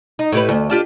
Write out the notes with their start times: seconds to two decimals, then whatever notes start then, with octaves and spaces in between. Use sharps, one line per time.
0.19 D#4
0.32 A2 G4 B4
0.49 D2
0.70 D4 F4 G4